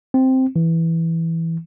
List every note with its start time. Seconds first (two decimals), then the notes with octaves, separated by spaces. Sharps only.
0.14 C4
0.56 E3